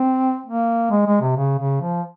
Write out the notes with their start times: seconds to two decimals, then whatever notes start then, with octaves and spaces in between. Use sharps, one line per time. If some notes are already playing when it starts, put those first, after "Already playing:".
Already playing: C4
0.46 A#3
0.91 G#3
1.06 G#3
1.22 C3
1.36 C#3
1.59 C#3
1.81 F3